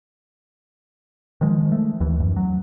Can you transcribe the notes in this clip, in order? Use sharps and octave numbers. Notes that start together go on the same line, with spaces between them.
D#3 F3 G#3
A3
D#2 E3
F#2
F#3